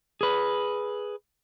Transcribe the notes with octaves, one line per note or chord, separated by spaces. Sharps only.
G#4 B4